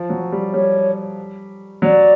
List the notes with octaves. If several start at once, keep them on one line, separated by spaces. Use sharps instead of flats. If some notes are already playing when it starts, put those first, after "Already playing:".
Already playing: F3
F#3
G3
G3 C#5
F#3 D5